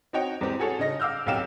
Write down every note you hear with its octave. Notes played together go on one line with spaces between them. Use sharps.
C4 D#4 F#4 C#5 D#5 G5
E2 G#2 C4 G4
F#4 G#4 A4 C#5
C#3 D#4 D#5 A#6
F5 D6 E6 F6 G6
D#1 B1 C3 F5 G5 E7